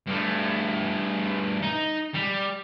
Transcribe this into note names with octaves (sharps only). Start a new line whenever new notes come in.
G2 A3
D#4
G3